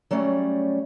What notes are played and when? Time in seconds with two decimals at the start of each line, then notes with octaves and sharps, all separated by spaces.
0.11 F#3 G3 A3 C#4